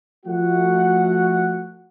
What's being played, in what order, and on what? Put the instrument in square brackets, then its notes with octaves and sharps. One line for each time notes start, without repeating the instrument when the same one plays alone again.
[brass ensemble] F3 A3 F#4 F#5